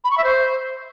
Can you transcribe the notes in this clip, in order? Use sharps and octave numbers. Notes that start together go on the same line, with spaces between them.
B5
C#6
E5
C5